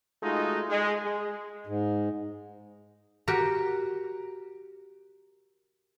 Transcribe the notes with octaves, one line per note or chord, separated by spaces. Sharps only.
G#3 A3 D#4 F4 F#4
G#3
G#3
G#2
F#4 G4 A#4